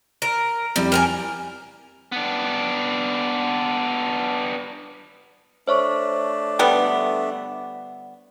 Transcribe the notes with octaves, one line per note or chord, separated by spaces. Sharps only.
A#4
F2 G3 E4 G4
A#4 G5 G#5
B3 D4
A3 D4 C5 C#5 C#6
D3 G3 B3